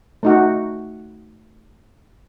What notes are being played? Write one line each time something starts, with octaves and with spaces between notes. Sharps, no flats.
A3 D#4 F#4